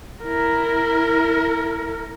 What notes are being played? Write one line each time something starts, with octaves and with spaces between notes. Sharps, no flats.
E4 A#4